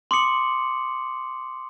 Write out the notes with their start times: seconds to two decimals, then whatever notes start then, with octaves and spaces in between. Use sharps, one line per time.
0.11 C6 D6 D#6 C#7 F#7